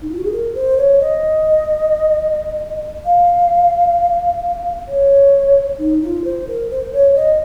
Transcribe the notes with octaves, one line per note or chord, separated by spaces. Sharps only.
D#4
F4
F#4
G#4
A#4
C5
C#5
D#5
F5
C#5
D#4
F4
C5
A#4
C5
C#5
D#5